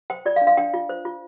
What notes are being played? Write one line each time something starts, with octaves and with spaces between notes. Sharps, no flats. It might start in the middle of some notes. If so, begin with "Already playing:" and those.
C5 G5
F4 D5
F5
D4
F5
D4 G5
F4
C5
F4